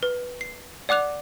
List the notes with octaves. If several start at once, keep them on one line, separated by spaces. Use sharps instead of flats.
B4
C7
D5 F#5 D6 F#6 F7